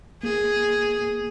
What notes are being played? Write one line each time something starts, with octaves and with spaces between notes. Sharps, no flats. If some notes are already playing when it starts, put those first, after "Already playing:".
A#3 G#4